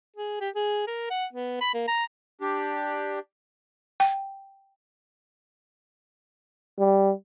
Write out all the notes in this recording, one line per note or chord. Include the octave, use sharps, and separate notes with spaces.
G#4
G4
G#4
A#4
F#5
B3
B5
A#3
A#5
D4 G4
G5
G3